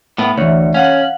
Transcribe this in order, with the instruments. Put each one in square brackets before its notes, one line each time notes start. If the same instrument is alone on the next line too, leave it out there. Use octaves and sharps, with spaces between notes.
[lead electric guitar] A2 B3
[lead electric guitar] D2 [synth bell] E3 C#5
[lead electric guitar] C#4 [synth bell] F5 F#5 F#7